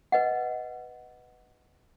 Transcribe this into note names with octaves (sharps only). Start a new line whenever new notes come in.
B4 D#5 F#5